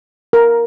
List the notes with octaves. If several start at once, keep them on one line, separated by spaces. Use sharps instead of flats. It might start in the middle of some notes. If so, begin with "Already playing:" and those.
A#4